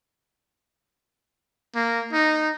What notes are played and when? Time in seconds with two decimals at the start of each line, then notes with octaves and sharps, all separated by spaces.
1.75 A#3
2.13 D#4